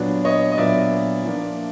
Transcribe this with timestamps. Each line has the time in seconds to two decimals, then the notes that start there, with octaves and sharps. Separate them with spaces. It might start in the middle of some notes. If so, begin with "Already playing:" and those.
Already playing: A#2 F#3 B3 D4
0.25 C#5 D#5
0.52 D#5
0.58 A#2 F#3 B3 D4 D5 E5
1.24 F3 A#3 D4